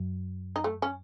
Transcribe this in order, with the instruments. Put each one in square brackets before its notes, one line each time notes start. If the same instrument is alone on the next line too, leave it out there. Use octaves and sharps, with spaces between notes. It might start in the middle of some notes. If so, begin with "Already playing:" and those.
Already playing: [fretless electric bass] F#2
[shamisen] D#4
A3
C#4